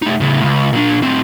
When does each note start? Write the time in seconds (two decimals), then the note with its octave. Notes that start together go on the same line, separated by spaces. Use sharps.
0.02 A3 D#4
0.20 A2 C#3
0.42 C#2
0.73 A#2 D4
1.02 A2 C4